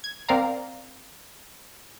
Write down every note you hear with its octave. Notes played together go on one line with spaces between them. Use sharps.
G#6
C4 A#4 D5 F5 A#5